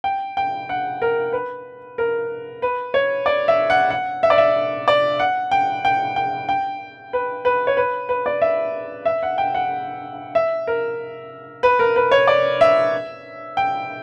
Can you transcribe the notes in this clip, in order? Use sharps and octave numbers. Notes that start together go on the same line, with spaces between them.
G5
G5
F#5
A#4
B4
A#4
B4
C#5
D5
E5
F#5
F#5
E5
D5
E5
D5
F#5
G5
G5
G5
G5
B4
B4
C#5
B4
B4
D5
E5
E5
F#5
G5
F#5
E5
A#4
B4
A#4
B4
C#5
D5
E5
G5